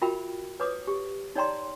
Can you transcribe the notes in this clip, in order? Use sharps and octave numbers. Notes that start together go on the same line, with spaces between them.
F4 F#4 A#4 E5 G5 B5
B4 C#5 D6 D#6
G4
D#4 C#5 D5 G5 A#5 C6